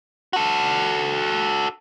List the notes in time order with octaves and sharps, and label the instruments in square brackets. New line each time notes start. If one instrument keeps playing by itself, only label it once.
[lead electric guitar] F#4 A4